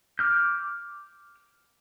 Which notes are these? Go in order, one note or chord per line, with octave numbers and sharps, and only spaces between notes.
D6 F6 G6